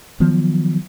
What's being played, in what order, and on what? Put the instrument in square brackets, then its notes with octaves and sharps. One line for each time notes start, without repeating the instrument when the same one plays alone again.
[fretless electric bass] D#3 F3 F#3 B3